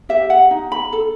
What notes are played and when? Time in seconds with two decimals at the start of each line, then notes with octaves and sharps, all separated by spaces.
0.09 G4 E5
0.30 F#5
0.51 D#4
0.72 B5
0.92 A4